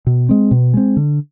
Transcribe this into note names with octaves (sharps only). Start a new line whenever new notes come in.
B2
G#3 C4
B2
G#3 C4
D3